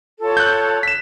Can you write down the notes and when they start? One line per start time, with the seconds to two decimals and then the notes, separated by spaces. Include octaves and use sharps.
0.20 F4 A4 C#5
0.37 F#6 G6
0.83 B6 E7